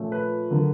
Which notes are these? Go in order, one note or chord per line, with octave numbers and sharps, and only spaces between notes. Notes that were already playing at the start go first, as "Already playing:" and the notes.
Already playing: A#2 F3 A3 C#4
B4
D3 F#3 A#3